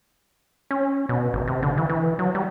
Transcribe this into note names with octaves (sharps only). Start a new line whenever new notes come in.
C#4
B2
G#1
C3
D3
E3
E3
F#3
G3